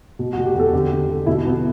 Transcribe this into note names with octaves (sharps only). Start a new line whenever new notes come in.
B2
F#4
B2
G4
E2 A4
D3 G4
D3
D3
B2 E4
B2 B3